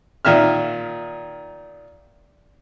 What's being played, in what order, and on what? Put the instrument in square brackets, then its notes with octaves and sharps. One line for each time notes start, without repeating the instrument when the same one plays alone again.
[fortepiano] A#2 D#3 E5 F6